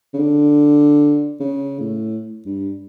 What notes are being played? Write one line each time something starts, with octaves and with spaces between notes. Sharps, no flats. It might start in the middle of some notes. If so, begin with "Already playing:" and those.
C#3
D3
C#3
A2
G2